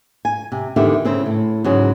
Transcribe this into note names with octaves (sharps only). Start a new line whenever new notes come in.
G#5
C3
E2 D3 D#3 G4 E5
C#3 C4 E4
A2
G#2 C#3 F#3 G#3